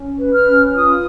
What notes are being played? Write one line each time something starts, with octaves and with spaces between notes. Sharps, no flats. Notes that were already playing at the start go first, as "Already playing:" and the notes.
Already playing: C#4
B4
F6
C#4
F4 D#6